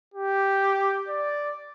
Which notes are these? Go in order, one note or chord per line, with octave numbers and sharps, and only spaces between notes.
G4
D5